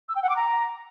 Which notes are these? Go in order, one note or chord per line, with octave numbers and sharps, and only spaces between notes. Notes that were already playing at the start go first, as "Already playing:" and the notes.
E6
G5
F#5
D6
A#5